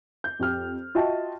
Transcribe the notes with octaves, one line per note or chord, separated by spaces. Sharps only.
G6
F2 G4 F6
F4 F#4 D#5 E5 G5 A5